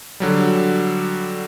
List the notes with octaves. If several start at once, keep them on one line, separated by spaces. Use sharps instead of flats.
D3 F#3 G3